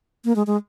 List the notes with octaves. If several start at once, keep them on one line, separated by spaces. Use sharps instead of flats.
A#3
G#3
G#3